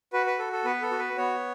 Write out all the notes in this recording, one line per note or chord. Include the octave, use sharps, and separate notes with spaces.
F#4 B4
B4
A4
A4
B3 B4
A4
F#4
B4
B3 C#5